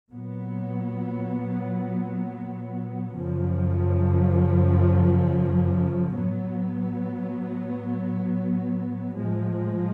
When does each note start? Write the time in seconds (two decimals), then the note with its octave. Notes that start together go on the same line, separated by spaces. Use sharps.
0.11 A#2 F#3 B3
3.13 F#2 C#3 F3
6.14 A2 F#3 B3
9.16 A2 F3 G#3